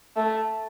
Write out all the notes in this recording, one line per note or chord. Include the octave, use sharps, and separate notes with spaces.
A3